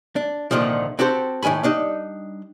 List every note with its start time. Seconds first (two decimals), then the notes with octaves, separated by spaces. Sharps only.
0.16 D4
0.51 C2 A#2 D3 D#3 F3
0.99 C4 F#4 G4 A4 C5
1.43 A2 D#3 G#3 G#5 B5
1.63 G3 D4 D#4